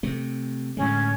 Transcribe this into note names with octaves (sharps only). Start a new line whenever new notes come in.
C3 A3
A2 D3 G#3 C#4